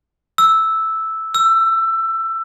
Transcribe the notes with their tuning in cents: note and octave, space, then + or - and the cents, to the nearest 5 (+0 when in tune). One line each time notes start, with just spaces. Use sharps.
E6 -5
E6 +20